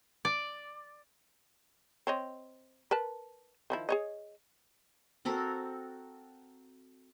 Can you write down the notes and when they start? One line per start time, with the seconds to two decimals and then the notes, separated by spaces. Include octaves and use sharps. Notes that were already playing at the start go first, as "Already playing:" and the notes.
0.25 D5
2.07 C4 C#5 D#5
2.91 A#4 B4 A5
3.70 D#3 F3 E4
3.89 G#4 C#5 D#5
5.25 C4 F#4 A4 A#4